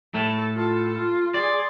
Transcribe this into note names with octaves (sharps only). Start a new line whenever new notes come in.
A2 A3 A4
F4 A4
F4
G#4 D5 C6